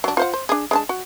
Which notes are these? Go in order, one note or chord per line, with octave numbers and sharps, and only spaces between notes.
F#3 D4
F4 C5 F#5
C5
D4 G#4
G#3 D4 A5
F#4